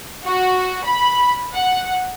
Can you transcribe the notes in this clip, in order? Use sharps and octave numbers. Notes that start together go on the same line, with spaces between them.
F#4
B5
F#5